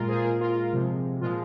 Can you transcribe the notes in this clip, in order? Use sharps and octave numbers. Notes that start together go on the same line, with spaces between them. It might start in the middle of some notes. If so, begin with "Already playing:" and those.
Already playing: A#2 G#3 F4 A#4
G#4 C5
A#2 G#3 F4 A#4
F4 A#4
C3 F3 G#3
A#2 F3 G#3 F4